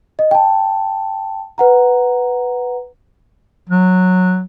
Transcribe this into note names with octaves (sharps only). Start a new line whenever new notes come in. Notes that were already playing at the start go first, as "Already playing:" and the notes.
D#5
G5 A5
B4 F#5 A#5
F#3